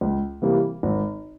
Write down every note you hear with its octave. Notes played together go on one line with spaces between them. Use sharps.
C#2
C3 E3 G3 A#3
G#1